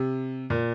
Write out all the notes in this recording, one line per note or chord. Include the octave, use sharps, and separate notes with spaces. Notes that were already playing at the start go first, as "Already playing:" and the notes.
Already playing: C3
A#2